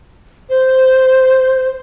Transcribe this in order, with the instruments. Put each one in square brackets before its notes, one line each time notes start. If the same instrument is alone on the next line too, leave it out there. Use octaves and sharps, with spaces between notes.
[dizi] C5